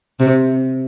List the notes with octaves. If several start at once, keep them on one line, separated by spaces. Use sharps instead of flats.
C3